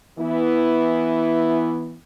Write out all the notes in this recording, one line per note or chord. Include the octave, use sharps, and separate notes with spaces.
E3 B3 E4